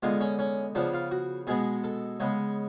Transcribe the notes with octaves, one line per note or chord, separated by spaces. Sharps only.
D3 G#3 B3 F4
C#4
C#4
C#3 F3 B3 D4
F4
F#4
B2 G#3 B3 G#4
A4
C#3 G#3 B3